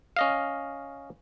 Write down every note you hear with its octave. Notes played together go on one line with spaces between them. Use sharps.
C#4 D#5 F5